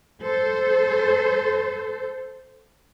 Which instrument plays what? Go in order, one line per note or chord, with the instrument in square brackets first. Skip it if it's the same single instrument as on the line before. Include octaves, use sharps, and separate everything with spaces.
[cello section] A4 C5